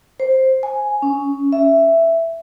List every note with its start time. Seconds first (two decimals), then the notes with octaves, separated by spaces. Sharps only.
0.20 C5
0.63 G#5
1.02 C#4
1.53 E5